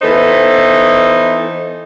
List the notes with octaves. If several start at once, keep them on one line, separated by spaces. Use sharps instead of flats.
E3 B3 D#4 A4 C5